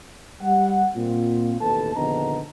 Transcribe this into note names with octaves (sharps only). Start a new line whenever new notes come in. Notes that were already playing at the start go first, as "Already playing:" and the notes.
G3 F#5
A#2 C4 F4
A1 D#2 B2 A4 B4 A5
A#1 D3 D#3 B3 D#5 A#5